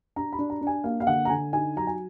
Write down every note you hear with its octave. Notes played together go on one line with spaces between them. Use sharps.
D4 A#5
B5
D4
A#5
D4
G#5
A#3 F5
F5
D3 F#5
A#5
D3 G#5
D#4 G#5
F#3 A#5
G#5